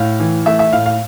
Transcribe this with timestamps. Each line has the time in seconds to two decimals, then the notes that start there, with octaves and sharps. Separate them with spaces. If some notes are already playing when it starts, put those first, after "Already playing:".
Already playing: A2 F5
0.20 E3
0.46 A3 E5
0.59 E5
0.72 A2 F5
0.86 F5